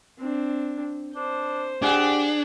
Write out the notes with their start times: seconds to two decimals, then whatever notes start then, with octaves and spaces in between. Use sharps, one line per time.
0.19 C4 D4
1.16 D4 C5
1.82 D4 G4 G#4 F#5